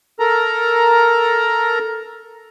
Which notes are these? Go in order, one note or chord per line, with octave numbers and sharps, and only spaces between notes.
A4 A#4 A#5